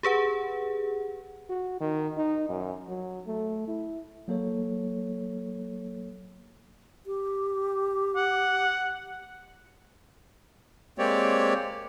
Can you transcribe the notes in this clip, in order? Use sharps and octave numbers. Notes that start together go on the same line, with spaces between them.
G4 G#4 B4 F#5
F#4
D#3
D#4
F#2
F#3
A3
E4
F#3 A#3 A4 C#5
G4
F#5
G#3 A#3 C4 G4 C#5 D5